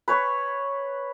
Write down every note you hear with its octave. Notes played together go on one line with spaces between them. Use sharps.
B4 C#5 C#6